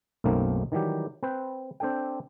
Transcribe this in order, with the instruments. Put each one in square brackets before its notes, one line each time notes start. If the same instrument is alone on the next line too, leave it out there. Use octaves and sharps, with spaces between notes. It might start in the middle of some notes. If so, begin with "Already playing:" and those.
[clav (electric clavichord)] B1 F#2 A3 A#3 C4 D#4
D#3 E3 F#3 G3 G4
C4 B4 G5
C4 D4 A4 G5